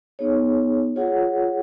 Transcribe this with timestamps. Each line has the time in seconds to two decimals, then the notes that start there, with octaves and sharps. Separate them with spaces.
0.19 B3 D#4 G#4 C#5
0.96 F4 G#4 C#5 F#5